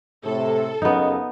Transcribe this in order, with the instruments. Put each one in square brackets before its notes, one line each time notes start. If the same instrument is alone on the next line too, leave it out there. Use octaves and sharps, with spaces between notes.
[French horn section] A2 C3 [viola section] A4
[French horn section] F#2 C#3 D#5 [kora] B3 D#4